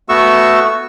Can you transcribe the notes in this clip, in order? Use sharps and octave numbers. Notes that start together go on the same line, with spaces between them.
A3 B3 F#4 C#6 E6